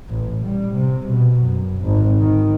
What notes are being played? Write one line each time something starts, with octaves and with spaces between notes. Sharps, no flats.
A1
G3
C3
B2
F#2
G#1
D#3